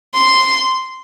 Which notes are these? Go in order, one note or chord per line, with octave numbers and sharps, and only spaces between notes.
C6